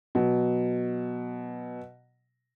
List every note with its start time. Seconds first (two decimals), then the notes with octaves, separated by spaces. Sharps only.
0.15 B2 F#3